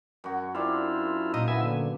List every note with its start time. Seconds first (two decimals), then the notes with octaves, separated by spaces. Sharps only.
0.24 F#2 F#4
0.55 C4 D4 E4 F4
1.34 A#2 D#4 D#5
1.48 B3 E4 E5 G#5
1.62 D3